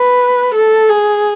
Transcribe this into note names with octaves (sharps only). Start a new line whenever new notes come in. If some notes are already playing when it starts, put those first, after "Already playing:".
Already playing: B4
A4
G#4